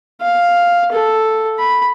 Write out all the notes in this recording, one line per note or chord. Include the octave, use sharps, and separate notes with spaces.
F5
A4
B5